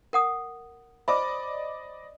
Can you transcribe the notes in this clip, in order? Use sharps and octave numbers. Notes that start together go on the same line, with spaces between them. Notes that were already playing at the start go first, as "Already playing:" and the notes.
A#4 F#5 D#6
C5 D5 D#5 B5 D6